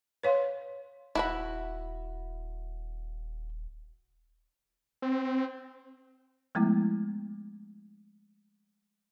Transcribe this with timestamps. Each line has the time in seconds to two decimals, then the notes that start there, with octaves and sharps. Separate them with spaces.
0.23 B4 C#5 F5 C6
1.15 D#1 E4 F#4 B5
5.02 C4
6.55 F3 G#3 A3 B3 E4